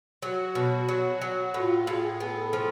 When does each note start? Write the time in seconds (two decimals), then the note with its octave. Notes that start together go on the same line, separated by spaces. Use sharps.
0.22 F#3 F#4
0.55 B2
0.89 F#3
1.21 F#3
1.54 A2 F4
1.87 A2 G#4
2.20 B3 A4
2.53 F3